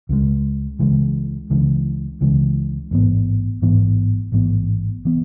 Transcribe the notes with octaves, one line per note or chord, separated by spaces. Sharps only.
C#2 C#3 E3 G#3
C#2 C#3 E3 G#3
C#2 C#3 E3 G#3
C#2 C#3 E3 G#3
A1 G#2 E3 B3
A1 G#2 E3 B3
A1 G#2 E3 B3
E3 B3